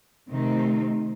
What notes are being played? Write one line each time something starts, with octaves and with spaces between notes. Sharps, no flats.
C3 D#3 A3 C4 D#4